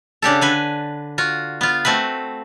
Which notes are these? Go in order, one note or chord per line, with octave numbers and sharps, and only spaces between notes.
C#3 D4 G4 A4
D3 B4 G#5
F4 F#4
B3 F4
A3 C4 F#4 B4